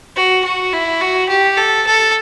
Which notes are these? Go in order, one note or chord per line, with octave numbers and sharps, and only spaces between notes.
F#4
F#4
E4
F#4
G4
A4
A4